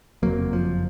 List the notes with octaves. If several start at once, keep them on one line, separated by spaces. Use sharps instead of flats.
F#1 F2 C3 F#3 A#3
F3